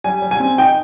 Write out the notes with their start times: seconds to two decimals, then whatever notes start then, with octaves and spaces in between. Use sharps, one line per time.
0.04 G3 G#5
0.22 G3
0.31 G#5
0.40 C4
0.58 D#4 G5